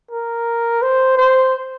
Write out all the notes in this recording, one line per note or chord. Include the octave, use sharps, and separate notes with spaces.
A#4
C5
C5